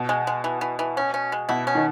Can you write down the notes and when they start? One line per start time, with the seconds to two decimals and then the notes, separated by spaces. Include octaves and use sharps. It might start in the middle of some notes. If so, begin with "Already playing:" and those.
Already playing: B2
0.09 G#3
0.27 G#3
0.44 E3
0.61 E3
0.79 E3
0.97 C#4
1.14 C#4
1.32 G#3
1.49 B2 E4
1.67 C#4
1.75 D#3